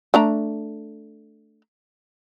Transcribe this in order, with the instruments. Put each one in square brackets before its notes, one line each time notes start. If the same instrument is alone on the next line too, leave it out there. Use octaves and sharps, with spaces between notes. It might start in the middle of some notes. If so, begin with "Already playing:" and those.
[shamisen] A3 D4 A#5